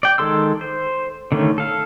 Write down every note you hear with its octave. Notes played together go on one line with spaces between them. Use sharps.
D5 G5
D#3 G#3 A4 C6 E6
C5
D3 D#3 A3 C#4
A4 F5